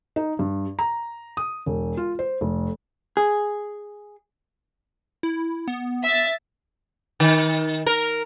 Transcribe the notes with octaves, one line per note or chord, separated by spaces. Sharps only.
D#4
G2
A#5
D#6
E1
F4
C5
F1
G#4
E4
B3
E5 A6
D#3
A#4